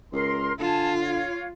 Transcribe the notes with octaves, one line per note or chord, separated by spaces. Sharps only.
C#2 A#4 C6
D3 F4 G#5 A5
C#5 F5